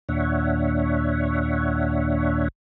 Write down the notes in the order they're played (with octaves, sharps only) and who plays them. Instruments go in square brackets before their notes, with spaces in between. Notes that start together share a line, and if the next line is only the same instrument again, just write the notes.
[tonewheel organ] D#2 A#2 D4 C#5 E5 F#5